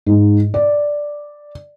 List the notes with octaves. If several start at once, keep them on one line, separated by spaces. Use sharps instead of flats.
G#2
D5